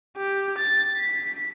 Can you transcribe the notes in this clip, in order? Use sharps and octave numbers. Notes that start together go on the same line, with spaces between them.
G4
A6
B6